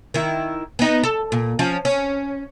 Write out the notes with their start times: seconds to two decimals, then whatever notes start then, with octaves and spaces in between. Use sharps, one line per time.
0.14 D#3 E4
0.79 B3 D#4
1.03 A4
1.32 A#2
1.59 F3 C#4
1.85 C#4